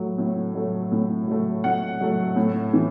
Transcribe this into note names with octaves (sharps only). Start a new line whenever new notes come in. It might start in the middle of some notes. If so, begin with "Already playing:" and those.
Already playing: A2 F#3 A3
A2
F#3 A3
A2
F#3 A3
A2 F#5
F#3 A3
A2
E3